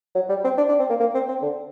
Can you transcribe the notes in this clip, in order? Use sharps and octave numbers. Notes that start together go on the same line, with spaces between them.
F#3
G3
C4
D4
D4
C4
A#3
A#3
C4
C4
D3